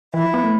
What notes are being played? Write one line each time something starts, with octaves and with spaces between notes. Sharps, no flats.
E3 E4
F3
B3
A3